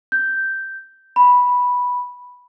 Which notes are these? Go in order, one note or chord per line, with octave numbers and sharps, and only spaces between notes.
G6
B5